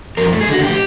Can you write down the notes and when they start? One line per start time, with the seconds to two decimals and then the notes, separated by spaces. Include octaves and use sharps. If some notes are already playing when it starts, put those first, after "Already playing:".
0.17 F2 A#4
0.33 A3
0.41 G#4
0.48 D3 F#4
0.63 A2 G4